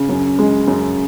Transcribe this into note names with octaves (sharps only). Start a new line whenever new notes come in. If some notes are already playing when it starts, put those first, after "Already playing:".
Already playing: C#3
F#2
G#3
F#2